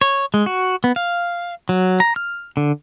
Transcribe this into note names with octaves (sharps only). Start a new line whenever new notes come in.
C#5
G#3
F#4
B3
F5
F#3
A#5
F6
D3